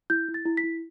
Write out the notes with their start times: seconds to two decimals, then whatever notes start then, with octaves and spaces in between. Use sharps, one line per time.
0.10 E4 G6
0.28 E4
0.34 A6
0.46 E4
0.57 B6
0.64 E4